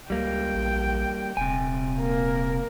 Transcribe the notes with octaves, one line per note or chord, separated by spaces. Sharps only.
C#2 G3 A#3 G5
A#1
D#1 C3 G5 G#5
A#3 A#4